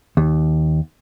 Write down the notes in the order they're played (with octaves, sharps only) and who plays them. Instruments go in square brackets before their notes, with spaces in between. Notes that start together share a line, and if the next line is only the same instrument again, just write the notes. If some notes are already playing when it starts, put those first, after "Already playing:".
[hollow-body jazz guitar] D#2